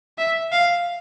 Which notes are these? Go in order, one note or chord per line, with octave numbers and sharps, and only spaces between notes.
E5
F5